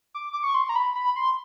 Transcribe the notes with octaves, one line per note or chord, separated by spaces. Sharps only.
D6
D6
C#6
C6
A#5
B5
B5
C6